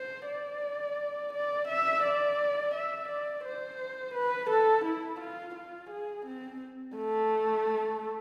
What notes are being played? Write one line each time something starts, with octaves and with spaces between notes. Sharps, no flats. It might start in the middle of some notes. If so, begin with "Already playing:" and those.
Already playing: C5
D5
D5
E5
D5
E5
D5
C5
B4
A4
E4
F4
F4
G#4
C4
A3